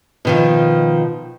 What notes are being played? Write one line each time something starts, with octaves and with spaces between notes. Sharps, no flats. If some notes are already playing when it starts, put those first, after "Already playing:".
B2 D#3 F3